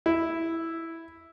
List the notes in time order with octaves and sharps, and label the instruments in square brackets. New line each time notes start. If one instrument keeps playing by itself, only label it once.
[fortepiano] E4